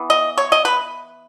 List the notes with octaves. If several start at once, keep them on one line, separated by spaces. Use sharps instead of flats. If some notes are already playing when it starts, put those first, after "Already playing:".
Already playing: E3 B3
D#5
C#5
D#5
B4